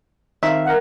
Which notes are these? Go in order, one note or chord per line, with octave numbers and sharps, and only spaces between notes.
D#3 C4 D#4 E5 F5
A#4 F#5